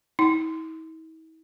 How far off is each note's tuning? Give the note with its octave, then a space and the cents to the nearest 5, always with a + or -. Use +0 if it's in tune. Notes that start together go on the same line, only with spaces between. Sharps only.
E4 -45